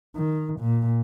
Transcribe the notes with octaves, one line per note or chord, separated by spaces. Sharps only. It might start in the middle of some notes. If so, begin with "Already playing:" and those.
D#3
A#2